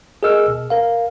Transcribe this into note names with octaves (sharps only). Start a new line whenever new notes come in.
G#4 A#4 D#5 E6 F6
B2
A#4 F5